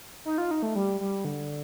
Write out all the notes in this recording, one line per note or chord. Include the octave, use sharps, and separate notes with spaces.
D#4
F4
D#4
A3
G3
G3
D3